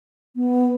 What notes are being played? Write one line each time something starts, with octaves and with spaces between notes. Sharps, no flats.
B3